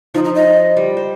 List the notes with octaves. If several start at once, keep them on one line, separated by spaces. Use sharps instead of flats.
F3 D#4
D#4
D#5
G3
C5